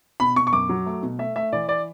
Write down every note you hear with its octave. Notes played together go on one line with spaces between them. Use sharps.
B2 B5
B2 C#6
C#6
F#2 D6
F#3
A3
B2
A3 E5
A3 E5
E3 D5
D5